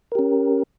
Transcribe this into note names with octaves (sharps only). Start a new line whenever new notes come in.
C#4 G4 A#4